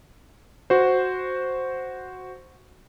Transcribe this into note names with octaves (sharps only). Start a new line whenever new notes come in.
F#4 C5